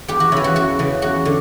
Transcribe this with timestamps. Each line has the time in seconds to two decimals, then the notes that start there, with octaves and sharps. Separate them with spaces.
0.08 E2 G4
0.20 F#4
0.32 C#3 E3 E4
0.44 F#4
0.56 E2 F#4
0.79 C#3 E3
1.02 E2 F#4
1.25 D3